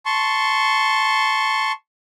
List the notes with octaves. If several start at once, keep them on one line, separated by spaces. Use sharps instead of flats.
A5 C6 C#6